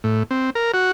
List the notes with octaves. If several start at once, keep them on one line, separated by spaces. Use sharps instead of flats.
A2
C4
A#4
F#4